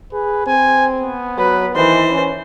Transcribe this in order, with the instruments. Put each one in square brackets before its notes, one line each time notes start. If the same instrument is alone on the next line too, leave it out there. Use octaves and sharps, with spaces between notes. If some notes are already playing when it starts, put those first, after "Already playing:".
[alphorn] G#4 [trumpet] B4
[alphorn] C4 [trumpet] G#5
[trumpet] B3
[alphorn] F#3 [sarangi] B4
[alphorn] D#3 [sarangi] E3 [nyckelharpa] C5
[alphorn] C#4